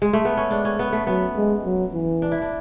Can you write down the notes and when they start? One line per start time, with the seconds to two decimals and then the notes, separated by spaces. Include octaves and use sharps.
0.02 G#3
0.13 A3
0.25 B3
0.37 C#4
0.50 G#3 D4
0.65 C#4
0.79 B3
0.92 A3
1.07 F#3 B3
1.36 G#3
1.65 F#3
1.94 E3
2.22 D4
2.32 E4
2.42 D4